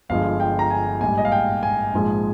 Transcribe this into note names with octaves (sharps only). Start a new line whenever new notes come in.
G1 G2 F3 G#3 F5
G5
A#5
G#5
A#1 G#2 G3 G#5
D#5
F5
G5
G#5
A#1 G#2 F3 G#3